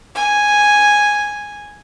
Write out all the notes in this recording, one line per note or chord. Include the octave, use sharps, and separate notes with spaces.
G#5